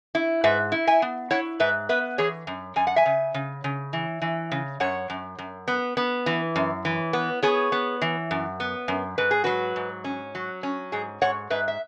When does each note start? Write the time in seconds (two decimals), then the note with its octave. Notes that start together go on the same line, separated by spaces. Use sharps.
0.15 E4
0.44 G#2 B4 E5
0.72 E4
0.87 E5 G#5
1.02 B3
1.31 E4 C#5 F#5
1.60 G#2 B4 E5
1.89 B3 B4 E5
2.18 E3 G#4 C#5
2.47 F#2
2.76 F#2 G#5
2.87 F#5
2.96 E5 G#5
3.06 C#3
3.34 C#3
3.64 C#3
3.93 E3
4.22 E3
4.52 C#3
4.80 F#2 C#5 F#5
5.10 F#2
5.38 F#2
5.68 B3
5.97 B3
6.26 E3
6.56 F#2
6.85 E3
7.13 B3
7.43 B3 G#4 C#5
7.72 B3
8.02 E3
8.31 F#2
8.60 B3
8.88 F#2
9.18 G#2 B4
9.31 G#4
9.44 F#3 F#4 B4
9.76 G#2
10.04 C#4
10.35 F#3
10.63 C#4
10.92 G#2 G#4
11.21 G#2 C#5 F#5
11.50 G#2 B4 E5
11.68 E5